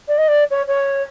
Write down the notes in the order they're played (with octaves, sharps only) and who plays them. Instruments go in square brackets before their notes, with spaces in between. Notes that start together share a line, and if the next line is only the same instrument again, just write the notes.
[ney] D5
D#5
D5
C#5
C#5